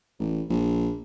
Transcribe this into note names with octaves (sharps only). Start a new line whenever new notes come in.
A1
A#1